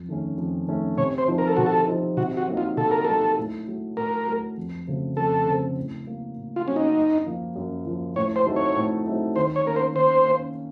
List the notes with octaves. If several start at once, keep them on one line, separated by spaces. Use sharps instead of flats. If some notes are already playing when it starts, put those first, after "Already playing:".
Already playing: F2
D#3 A3 C#4
F2
D#3 A3 C#4
C3 C#5
C5
F3 C4 D#4
A#4
A4
C3 F#4
A4
F3 C4 D#4
C3 F#4
F#4
F#3 A#3 D#4
F4
C3 A4
A#4
F#3 A#3 D#4 A4
A2
F#3 A3
A2 A#4
F#3 A3
F2
C#3 F#3 A3 C4
F2 A4
C#3 F#3 A3 C4
A2
F#3 A#3
A2
F4
F#3 A#3 C#4
D#4
F#2
F3 A#3
F#2
F3 A#3
A2 C#5
C5
F#3 A3 C4 D#4
C#5
A2
F#3 A3 C4 D#4
D#3 C5
C#5
A#3 C#4 A#4
C5
D#3 C5
A#3 C#4